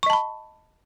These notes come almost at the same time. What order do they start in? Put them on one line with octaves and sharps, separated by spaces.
C#6 D#5 A5 B5